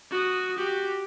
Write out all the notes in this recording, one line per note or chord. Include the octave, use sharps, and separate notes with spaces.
F#4 D#6
F#4 G4